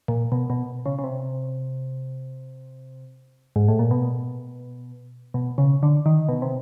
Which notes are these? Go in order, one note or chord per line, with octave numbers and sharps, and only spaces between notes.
A#2
B2
B2
C#3
C#3
C3
G#2
A2
A#2
B2
B2
C#3
D3
D#3
B2
C3